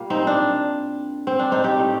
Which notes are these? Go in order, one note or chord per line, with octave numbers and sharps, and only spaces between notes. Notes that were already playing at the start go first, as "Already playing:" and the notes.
Already playing: A#2 G3 A#3
C4 D#4
D4
C4
D4
C4 D#4
D#4 G4
A2 A3